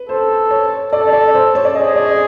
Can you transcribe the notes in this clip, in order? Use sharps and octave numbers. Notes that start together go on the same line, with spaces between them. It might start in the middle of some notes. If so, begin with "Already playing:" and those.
Already playing: B4
A4 C5
C#5
A4 D5
D5
C5
C#5
D5
G#4 D#5
D5